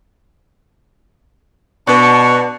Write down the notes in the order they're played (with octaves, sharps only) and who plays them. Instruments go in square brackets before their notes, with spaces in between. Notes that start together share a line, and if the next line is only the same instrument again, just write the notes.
[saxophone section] B2 [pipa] B3 D4 [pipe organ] C#6